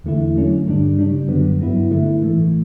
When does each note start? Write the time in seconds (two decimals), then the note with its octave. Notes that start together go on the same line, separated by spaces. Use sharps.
0.04 E2 D3 A3 E4
0.35 D3 F#3 A3 C#4
0.67 G2 D3 G3 D4
0.97 C#3 G3 D4
1.28 F#2 D3 F#3 B3
1.59 G2 F#3 B3 E4
1.90 D3 A3 E4
2.21 A2 E3 A3